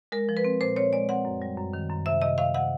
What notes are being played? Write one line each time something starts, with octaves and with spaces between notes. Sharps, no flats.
G#3 A#4
F3
B4
C4
A#2 C5
C4 C#5
G#3 D5
C4 F#5
F#2
G3
F#2
D#3
F#2
C3 E5
C3 D#5
C3 F5
C3 F#5